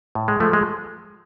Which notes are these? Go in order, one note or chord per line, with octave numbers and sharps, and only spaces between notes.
A2
G#3
F3 G#3 A3
G#3